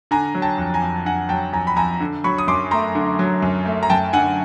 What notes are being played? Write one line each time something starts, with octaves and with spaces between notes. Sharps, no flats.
D3 G#5 A#5
F#3
G5 A5
F2
G#5 A#5
F2
D3 F#5 G#5
F#3 G5 A5
F2 G#5 A#5
B5
F2 G#5 A#5
D3
F#3 B5 C#6
D#6
F#2 C6 D6
A3 A#5 C6
D3
F#3
F#2
A3
A#5
F#2 G5 A5
D3 F#5 G#5